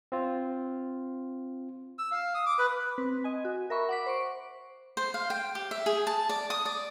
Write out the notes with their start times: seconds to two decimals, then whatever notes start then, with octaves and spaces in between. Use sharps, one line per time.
0.12 C4 F4
1.99 E6
2.12 F5
2.34 D#6
2.46 D6
2.58 B4
2.98 C4 B4
3.24 D#5 G#5
3.45 F#4
3.70 A#4 E5 B5 C#6
3.89 F#5 D6 B6
4.06 C5 C#6 D7
4.97 C5
5.14 F5
5.30 G5
5.55 G4
5.71 E5
5.86 G#4
6.07 A5
6.29 D5
6.50 D#6
6.65 D5